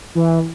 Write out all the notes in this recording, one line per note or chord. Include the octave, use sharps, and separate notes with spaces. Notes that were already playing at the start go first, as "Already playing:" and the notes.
E3